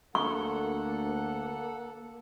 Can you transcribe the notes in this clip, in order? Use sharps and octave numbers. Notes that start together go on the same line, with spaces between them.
D2 A#3 A4 F#5 C#6